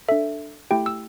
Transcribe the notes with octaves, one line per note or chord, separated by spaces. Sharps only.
D4 A4 E5
A3 E4 G4 G5
E6